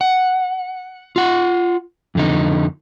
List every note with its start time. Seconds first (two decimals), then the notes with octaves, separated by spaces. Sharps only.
0.01 F#5
1.16 F4 F#5
2.15 F2 D3 D#4